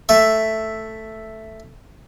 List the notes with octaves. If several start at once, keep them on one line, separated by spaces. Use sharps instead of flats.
A3 E5